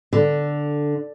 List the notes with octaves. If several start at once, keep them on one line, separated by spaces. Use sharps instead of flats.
D3